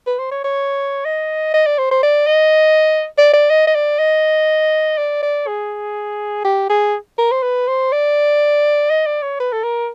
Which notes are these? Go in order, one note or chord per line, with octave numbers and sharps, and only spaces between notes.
B4
C5
C#5
C#5
D#5
D#5
D5
C5
C5
D5
D#5
D5
D5
D#5
D#5
D5
D#5
D5
D5
G#4
G4
G#4
A#4
C5
B4
C5
D5
D#5
D5
C#5
B4
A4
A#4